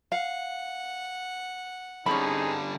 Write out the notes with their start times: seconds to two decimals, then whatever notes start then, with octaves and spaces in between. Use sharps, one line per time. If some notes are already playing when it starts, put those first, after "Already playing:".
0.12 F5 F#5
2.06 D3 G3 C4 C#4 D#4 G#4 B5